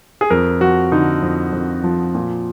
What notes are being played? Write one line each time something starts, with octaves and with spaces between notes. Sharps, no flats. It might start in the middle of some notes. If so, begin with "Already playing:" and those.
G#4
F2 A#4
F3 F#4
D3 D#4
F2
F2
F3
A#2